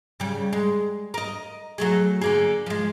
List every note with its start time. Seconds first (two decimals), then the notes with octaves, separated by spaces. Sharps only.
0.20 C#3 G3
0.53 G#3
1.14 A#4 D#5
1.78 F#3 A3 G#4
2.21 D3 A#3 G#4
2.66 F3 G#3